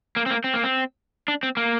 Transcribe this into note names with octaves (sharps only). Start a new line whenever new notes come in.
A#3
C4
A#3
C4
A#3
C4
D4
C4
A#3